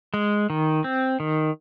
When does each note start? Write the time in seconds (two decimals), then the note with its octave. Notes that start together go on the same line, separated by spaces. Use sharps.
0.14 G#3
0.50 D#3
0.84 C4
1.20 D#3